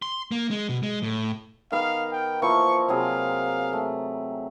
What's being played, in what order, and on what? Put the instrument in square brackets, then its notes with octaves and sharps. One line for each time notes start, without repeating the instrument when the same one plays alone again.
[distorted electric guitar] C6
A#3
G#3
B2
G#3
A2
[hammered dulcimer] D#3 B3 A#4 [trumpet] F5
[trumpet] G5
[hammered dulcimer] E3 F3 A#3 [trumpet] C#6
[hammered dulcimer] C3 F#3 G#4 [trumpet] F5
[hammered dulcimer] A3